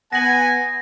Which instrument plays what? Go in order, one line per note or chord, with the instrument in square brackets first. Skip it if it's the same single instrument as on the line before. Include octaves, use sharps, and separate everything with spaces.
[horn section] B3 G#5 [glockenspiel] A#6 F#7